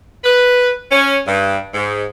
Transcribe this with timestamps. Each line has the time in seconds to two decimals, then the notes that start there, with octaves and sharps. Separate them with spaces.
0.24 B4
0.92 C#4
1.26 G2
1.74 G#2